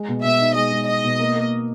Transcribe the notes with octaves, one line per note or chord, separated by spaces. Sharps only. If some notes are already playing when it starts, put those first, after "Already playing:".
Already playing: G#3
B2
B2 E5
D#4
G#3 D#5
G#3
D#4 D#5
B2
A#3
A#3